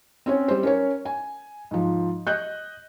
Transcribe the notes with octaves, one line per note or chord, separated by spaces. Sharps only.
C4 C#4 C#5
G3 C5
C#4 A#4 C#5
G#5
G#2 F3
D#5 F#6 G6